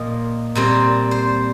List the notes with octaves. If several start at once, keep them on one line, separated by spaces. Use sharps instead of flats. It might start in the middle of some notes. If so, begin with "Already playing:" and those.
Already playing: A#2 F3 A#3 D#5
A#2 G3 C4
C5